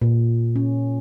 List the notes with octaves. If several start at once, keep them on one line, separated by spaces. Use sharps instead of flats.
A#2
C#4